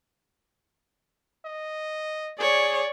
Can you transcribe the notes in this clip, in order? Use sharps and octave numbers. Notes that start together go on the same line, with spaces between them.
D#5
G#4 C#5 D5